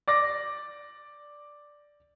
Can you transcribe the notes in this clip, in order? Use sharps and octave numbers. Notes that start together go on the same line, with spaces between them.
D5 D6 A#6